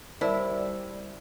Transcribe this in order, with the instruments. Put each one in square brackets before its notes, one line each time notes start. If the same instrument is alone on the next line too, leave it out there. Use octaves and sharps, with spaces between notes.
[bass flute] G3 [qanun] E4 [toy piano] A#4 C5 A5 [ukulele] D5 E5